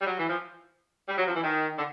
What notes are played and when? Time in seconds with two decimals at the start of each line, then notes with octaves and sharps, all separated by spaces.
0.01 G3
0.06 F#3
0.18 E3
0.29 F3
1.08 G3
1.17 F#3
1.26 F3
1.34 E3
1.43 D#3
1.77 D3